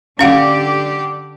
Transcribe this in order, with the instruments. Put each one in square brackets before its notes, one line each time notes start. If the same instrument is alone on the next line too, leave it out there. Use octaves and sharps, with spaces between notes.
[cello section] D3 G4 D5 [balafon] C#4 F5 F#5